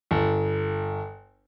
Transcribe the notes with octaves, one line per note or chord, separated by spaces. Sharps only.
G1